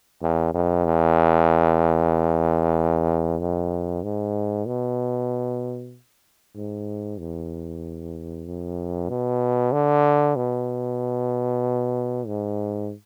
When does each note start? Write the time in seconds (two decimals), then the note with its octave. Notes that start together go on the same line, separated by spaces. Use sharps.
0.22 E2
0.54 F2
0.85 E2
3.39 F2
4.03 G#2
4.66 B2
6.56 G#2
7.19 E2
8.47 F2
9.09 B2
9.73 D3
10.36 B2
12.27 G#2